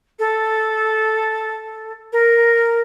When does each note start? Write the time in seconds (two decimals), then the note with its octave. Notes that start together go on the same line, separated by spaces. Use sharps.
0.19 A4
2.12 A#4